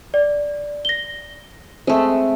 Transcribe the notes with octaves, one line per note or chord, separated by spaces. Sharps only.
D5
A#6 G7
G#3 A3 C4